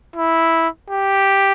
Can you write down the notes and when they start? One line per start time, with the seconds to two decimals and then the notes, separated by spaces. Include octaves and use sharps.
0.16 E4
0.90 G4